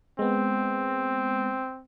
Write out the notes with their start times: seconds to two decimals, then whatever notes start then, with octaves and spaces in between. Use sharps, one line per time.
0.19 G#3 B3 C4